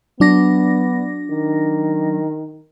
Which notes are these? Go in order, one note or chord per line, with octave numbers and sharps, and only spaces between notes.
F#3 B3 D4 A#6
D#3